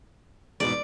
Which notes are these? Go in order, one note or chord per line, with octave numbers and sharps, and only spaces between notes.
E2 G#2 B2 D5